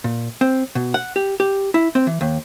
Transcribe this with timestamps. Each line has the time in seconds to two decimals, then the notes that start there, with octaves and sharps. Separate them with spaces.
0.04 A#2
0.41 C4
0.75 B2
0.94 F#5
1.16 G4
1.40 G4
1.74 E4
1.95 C4
2.07 E3
2.21 D#2